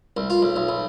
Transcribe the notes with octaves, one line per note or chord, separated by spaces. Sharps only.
C2
F4
B1
B1
B1